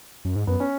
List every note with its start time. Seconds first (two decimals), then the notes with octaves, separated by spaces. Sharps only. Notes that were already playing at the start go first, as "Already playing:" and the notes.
0.25 F#2
0.36 G#2
0.47 F#2 B3
0.60 C#4